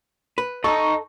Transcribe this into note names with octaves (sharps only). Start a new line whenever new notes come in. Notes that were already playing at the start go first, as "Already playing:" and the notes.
B4
A4 D#5 A#5 C#6